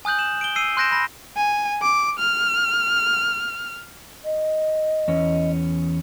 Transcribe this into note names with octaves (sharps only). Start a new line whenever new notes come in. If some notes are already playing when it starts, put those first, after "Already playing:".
G#5 D#6 F#6 G6 F#7
E7 F#7
D7 G7
E6 C7 D#7
C6 F#6 G6 A#6 D7 E7
B5 A#6
G#5
D6
F6
D#5
E2 C#4